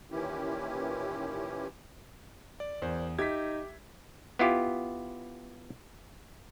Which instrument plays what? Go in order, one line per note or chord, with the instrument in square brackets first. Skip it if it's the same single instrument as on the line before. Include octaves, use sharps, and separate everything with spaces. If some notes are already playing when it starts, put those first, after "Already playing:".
[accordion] A#2 D#3 E3 C#4 E4 G4
[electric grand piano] D5
[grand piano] E2 [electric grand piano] A#4 C5 D5
[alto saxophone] D#4 [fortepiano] G4 [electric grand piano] E5 [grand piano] G#6 B6
[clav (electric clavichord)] B3 E4 F4 G4